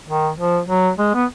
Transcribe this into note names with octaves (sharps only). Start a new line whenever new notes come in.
D#3
F3
F#3
G#3
B3